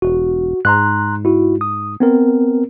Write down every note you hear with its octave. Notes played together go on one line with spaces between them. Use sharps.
E1 F#4
G#2 A#5 C6 F#6
E4 F#4
D#6
B3 C4 A#4